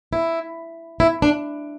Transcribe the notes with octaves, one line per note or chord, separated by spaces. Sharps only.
E4
E4
D4